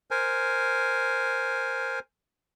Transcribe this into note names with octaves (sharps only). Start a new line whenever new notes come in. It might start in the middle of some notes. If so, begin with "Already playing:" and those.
A#4 C5 G#5